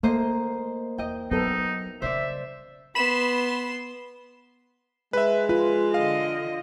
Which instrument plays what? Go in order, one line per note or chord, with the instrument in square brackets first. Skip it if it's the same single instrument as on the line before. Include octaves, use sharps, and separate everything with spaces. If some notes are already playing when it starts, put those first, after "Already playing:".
[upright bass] D#3 [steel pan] A3 [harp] A#3 C5 D#5
[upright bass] E2 [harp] D#5 G5
[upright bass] F#3 [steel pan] B3 A4 [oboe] D#4
[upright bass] C#3 G3 [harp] C5 D5 [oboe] E5
[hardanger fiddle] B3 C6 [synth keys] B5 E7
[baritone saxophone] G#3 [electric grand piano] B4 E5
[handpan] F4 [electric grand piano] B4
[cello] D3 D#5 [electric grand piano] F5